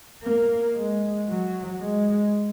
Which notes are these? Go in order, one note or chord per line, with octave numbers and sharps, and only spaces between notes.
A#3
G#3
F#3
G#3